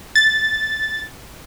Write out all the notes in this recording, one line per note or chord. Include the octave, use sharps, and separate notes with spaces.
A6